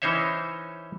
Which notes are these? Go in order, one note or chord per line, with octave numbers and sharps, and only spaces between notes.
E3 C#4 D#4 C5 C#5 E5